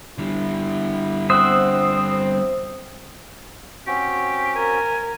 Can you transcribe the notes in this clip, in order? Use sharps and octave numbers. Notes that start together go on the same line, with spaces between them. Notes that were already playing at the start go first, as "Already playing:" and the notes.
D3 G3 E4
C4 C5 E5 F#5 D#6
C4 C#4 F#4 G4
A#4 G#5